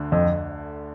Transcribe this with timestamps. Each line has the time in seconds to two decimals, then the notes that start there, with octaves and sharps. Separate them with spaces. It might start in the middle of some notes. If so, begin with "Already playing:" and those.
Already playing: D2 D3 A3 D4
0.12 F2